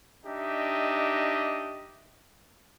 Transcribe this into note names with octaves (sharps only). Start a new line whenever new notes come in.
D4 D#4 G4 D#5 E5